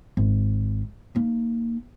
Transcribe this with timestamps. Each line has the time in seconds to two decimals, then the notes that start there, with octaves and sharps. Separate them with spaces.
0.17 G#1
1.15 A#3 D#4